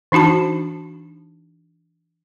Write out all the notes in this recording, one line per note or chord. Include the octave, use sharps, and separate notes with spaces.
E3 D4 D#4 F#4 A5